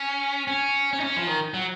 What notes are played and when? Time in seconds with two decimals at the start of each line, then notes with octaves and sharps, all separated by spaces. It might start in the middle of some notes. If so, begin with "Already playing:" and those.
Already playing: C#4
0.47 C#4
0.93 C#4
1.00 D#4
1.04 C#4
1.16 F3
1.27 D#3
1.54 F#3